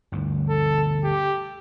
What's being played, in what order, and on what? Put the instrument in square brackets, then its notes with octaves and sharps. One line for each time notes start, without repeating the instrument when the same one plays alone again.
[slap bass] G1 D2 G2
[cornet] A4
G4